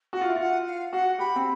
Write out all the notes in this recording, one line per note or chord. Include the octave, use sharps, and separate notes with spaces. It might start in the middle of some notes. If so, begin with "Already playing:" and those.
F#4 F#5
F4
E4
F4 F#5
F5
F#4 F#5
G4 B5
C4